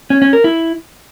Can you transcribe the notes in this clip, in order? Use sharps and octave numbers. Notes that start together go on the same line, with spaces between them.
C#4
C#4
A#4
E4